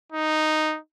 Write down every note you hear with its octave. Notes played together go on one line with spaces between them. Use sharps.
D#4